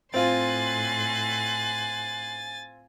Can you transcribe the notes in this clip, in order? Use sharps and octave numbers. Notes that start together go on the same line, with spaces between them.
A2 C4 F4 G#5 C6 F#6 A6